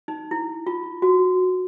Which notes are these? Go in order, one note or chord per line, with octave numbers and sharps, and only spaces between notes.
D#4
E4
F4
F#4